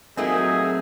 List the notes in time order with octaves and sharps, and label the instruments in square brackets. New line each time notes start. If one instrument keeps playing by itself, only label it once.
[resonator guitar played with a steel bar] A#2 A#3 D#4 [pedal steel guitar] F#3 A3 C4 [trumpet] G#4 [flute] E5